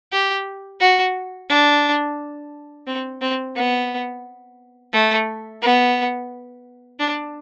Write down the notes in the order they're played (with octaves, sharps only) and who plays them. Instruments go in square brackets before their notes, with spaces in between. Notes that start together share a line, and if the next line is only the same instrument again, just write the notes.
[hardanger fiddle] G4
F#4
D4
C4
C4
B3
A3
B3
D4